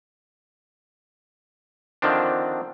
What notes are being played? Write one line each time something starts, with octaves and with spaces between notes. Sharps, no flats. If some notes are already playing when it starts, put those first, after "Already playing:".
D3 D#3 F3 C4 D4